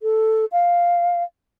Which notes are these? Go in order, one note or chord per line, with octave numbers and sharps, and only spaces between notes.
A4
F5